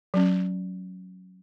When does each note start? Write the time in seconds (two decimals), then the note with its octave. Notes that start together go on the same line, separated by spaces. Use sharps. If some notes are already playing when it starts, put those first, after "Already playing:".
0.14 F#3 C#4